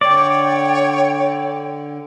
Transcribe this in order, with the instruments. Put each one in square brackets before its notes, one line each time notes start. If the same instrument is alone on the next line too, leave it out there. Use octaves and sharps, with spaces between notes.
[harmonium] D3 [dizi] C#5 [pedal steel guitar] D5 [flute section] G5